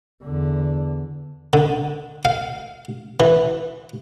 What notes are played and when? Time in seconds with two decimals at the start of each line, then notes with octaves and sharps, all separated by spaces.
0.23 E2 D3
1.53 D3
2.25 F5
3.20 E3